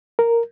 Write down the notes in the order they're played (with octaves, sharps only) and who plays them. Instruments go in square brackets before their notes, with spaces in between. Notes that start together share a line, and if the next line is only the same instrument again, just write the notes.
[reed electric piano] A#4